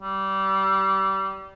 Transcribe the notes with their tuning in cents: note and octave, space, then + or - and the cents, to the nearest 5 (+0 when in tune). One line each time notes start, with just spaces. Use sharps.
G3 -25